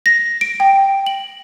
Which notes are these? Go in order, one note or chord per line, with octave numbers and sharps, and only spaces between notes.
A#6
D7
G5
F#7